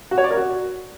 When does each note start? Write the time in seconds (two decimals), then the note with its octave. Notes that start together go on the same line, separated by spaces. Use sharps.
0.11 F#4
0.18 C#5
0.24 D5
0.30 A#4
0.37 F#4